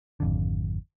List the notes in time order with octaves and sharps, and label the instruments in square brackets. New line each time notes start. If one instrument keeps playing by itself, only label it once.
[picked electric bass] G#1 F2 D3